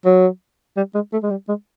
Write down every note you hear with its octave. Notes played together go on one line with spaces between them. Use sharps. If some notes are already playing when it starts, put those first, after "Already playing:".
F#3
G3
G#3
A3
G#3
G3
G#3